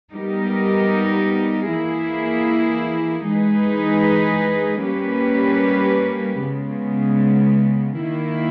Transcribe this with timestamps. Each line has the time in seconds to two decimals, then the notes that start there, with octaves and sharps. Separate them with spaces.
0.13 G3 B3 D#4 G4 A#4
1.70 E3 A#3 E4 G#4
3.27 E3 G#3 D#4 G#4 B4
4.84 G3 A#3 C#4 G4 B4
6.41 C#3 G#3 B3
7.98 D#3 A#3 E4